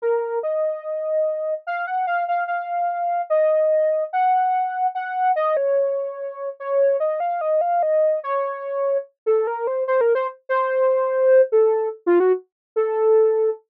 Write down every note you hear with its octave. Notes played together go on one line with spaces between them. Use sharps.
A#4
D#5
F5
F#5
F5
F5
F5
D#5
F#5
F#5
D#5
C#5
C#5
D#5
F5
D#5
F5
D#5
C#5
A4
A#4
C5
C5
A#4
C5
C5
A4
F4
F#4
A4